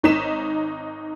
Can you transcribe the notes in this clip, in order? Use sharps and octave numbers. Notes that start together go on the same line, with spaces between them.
G#1 D#4 C#5 B6 E7